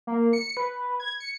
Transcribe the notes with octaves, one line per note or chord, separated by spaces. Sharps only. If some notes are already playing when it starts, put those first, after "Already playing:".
A#3
C#7
B4
G#6
C#7